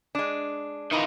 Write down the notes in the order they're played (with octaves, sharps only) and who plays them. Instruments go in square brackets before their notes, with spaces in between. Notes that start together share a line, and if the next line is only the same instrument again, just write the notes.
[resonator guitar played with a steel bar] G#3 D4
[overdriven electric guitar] D#3 F4 [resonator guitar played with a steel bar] E3 D#4